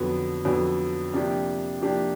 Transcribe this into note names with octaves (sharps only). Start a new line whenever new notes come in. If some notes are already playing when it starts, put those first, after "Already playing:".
Already playing: F2 D3 F#3 B3
F2 D3 F#3 B3
C3 F3 A#3 D4 G4
C3 F3 A#3 D4 G4